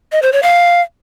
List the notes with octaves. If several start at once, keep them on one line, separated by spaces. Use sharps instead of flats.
D#5
C5
C#5
F5